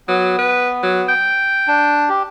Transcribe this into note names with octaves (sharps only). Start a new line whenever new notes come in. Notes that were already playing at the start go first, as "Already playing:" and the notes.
F#3 B3
B4
F#3
G5
D4
G4